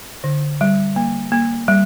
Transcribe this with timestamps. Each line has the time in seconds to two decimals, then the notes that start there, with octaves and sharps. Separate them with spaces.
0.24 D3
0.61 G3
0.96 A#3
1.32 A#3
1.68 G3